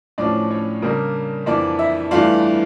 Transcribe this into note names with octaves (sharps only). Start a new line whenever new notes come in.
A2 F3 C#4 D4 D5
C#4 C#5
C#3 G3 A#3 D4 A#4
F2 E3 A#3 D4 D5
E4 E5
G2 E3 A3 D4 F4 F5